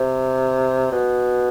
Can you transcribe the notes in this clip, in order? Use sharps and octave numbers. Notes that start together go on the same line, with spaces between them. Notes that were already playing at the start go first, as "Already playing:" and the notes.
Already playing: C3
B2